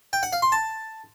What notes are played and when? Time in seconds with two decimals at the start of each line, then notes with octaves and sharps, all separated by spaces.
0.13 G5
0.23 F#5
0.33 F5
0.42 C6
0.52 A5